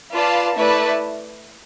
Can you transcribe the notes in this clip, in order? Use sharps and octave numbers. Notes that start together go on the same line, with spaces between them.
F4 B4 D5 F5 A5
A3 E4 B4 D5 A5